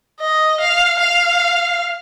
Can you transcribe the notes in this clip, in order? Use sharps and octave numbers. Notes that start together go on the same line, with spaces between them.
D#5
F5
F5